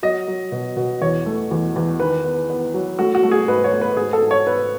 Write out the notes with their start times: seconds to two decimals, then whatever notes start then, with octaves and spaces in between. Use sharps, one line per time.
0.03 F#3 D#5
0.28 F#3
0.52 B2
0.77 B2
1.02 E2 C#5
1.26 A3
1.51 E2
1.76 E2
2.00 D#3 B4
2.25 B3
2.50 B3
2.74 F#3
2.99 A3 F#4
3.15 F#4
3.23 A3
3.31 G#4
3.48 G#2 B4
3.64 C#5
3.72 A3
3.81 B4
3.97 G#2 G#4
4.13 A4
4.22 G#2
4.31 C#5
4.47 G#2 B4